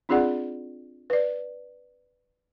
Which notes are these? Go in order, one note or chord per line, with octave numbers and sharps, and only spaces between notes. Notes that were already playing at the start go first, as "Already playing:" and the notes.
C4 D4 F4 G#4 D5 F#5
B4 D5